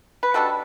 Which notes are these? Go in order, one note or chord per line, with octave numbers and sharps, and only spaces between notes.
B4
B2 G3 D4 F#4 A4